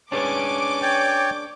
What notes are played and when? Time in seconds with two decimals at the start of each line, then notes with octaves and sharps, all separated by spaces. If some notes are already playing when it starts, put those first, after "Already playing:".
0.12 C#4 D4 G#4 B4 D6
0.82 C#5 D5 G5